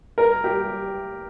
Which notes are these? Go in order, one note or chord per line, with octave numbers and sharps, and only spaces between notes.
A#4
G4